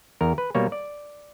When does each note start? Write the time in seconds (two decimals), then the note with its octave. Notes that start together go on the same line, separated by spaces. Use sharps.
0.21 E2 A#4
0.38 B4
0.55 B2 G3 A#3 C#5
0.72 D5